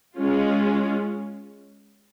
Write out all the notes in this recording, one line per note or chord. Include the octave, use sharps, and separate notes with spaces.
G#3 C#4 F4